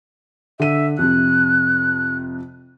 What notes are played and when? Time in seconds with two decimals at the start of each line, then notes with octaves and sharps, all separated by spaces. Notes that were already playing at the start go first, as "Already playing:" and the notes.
0.60 D3 E5 D#7
0.99 F2 C3 F#6